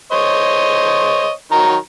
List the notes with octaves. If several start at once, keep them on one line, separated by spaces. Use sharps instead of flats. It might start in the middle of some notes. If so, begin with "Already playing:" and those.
C5 C#5 D#5
D#3 F#3 A#5